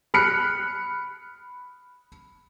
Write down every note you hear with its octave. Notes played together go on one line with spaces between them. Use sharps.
B5 F6 F#6 C#7